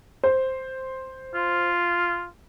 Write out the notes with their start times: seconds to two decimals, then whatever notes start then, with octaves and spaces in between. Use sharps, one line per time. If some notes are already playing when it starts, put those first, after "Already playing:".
0.24 C5
1.35 F4